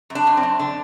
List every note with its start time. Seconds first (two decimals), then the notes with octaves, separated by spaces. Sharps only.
0.10 F#2
0.15 D4
0.27 F#2
0.37 C4
0.43 F#2
0.59 D3 D4